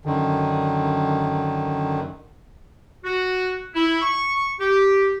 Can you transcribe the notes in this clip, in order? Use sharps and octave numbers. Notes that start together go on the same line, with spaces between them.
F#2 D3 D#3
F#4
E4
C#6
G4